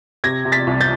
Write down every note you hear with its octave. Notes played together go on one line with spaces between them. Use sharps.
C3 G#6 A#6
C3
A6 B6
C2
G6 A6